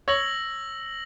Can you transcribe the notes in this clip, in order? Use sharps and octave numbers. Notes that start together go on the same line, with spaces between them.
C#5 E6 A#6 F#7